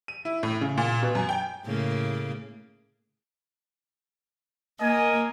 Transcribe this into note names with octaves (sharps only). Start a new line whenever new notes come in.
D#7
E4
A2
C#3
A#2
B2
F#2
G5
A2 C#3 A#3
A#3 A#4 D#5 G#5